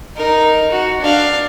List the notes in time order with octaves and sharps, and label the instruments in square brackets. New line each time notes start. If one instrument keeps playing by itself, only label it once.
[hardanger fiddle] D#4 A#4
F#4
D4 F5